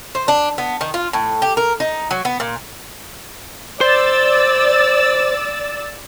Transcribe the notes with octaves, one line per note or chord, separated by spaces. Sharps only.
C5
D4
B3
D#3
F4
A2
G4
A#4
D#4
F#3
B3
A#2
C5 D5 E6 A6